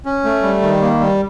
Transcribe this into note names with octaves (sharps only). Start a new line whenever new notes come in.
C#4
A3
G3
D#3
A#3
G3